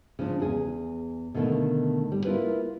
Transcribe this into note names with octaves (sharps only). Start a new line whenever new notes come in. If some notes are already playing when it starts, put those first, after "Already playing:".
C#3 F3 D4
E2 G#4
B2 D3 D#3 A3 A#3
G3
A#3 E4 F4 A#4 B4